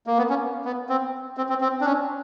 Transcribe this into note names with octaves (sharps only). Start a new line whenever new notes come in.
A#3
B3
C#4
B3
C4
C4
C4
C4
D4
C#4